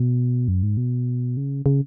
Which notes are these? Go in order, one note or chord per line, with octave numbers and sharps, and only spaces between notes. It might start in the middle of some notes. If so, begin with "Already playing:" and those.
Already playing: B2
F#2
G#2
B2
C#3
C#3